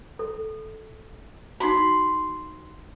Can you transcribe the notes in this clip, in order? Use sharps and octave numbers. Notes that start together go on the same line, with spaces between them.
A4
D#4 F#4 B5 C6